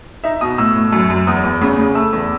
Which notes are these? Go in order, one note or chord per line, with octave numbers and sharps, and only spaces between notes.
D#4 E5
B2 D#6
A2 E6
A2
F#2
F#2
E2 D#6
E2
C#3
C#3
A3 E6
E2